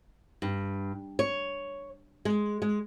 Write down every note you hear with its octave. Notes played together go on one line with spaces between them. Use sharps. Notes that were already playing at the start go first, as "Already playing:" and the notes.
G2
C#5
G#3
G#3